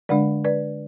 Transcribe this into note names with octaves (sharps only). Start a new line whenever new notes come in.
D3 G#3 D4 D5 F#5
B4 D5